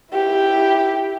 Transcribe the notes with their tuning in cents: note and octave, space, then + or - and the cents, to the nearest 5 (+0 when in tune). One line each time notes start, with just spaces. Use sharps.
E4 -5 G4 +0